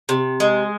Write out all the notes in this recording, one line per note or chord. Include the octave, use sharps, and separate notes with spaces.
C3
G#3